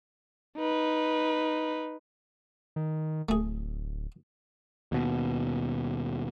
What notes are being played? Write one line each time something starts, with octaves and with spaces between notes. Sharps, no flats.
D#4 B4
D#3
D1 A3 G#4
D#2 B2